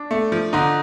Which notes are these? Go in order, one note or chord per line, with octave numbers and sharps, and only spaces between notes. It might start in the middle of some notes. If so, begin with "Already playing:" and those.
Already playing: D4
A3
F3
D3 D#4